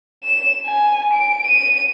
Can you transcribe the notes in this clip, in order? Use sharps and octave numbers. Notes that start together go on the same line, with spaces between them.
E7
G#5
D7
D#7